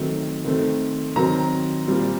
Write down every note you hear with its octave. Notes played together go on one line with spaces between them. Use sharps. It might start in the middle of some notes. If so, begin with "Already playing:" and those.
Already playing: D#3 F#3 A3 C4
D#3 A3 C4
D#3 F#3 C4 A#5
A#2 G3 C4